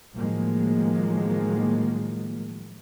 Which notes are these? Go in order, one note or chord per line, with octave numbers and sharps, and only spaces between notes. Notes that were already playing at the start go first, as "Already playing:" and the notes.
A2 D#3 F3 F#3 G#3 A#3